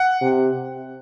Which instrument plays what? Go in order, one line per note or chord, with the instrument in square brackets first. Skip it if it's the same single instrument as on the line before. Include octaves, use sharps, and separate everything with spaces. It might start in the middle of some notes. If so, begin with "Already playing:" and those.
Already playing: [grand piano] F#5
[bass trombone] C3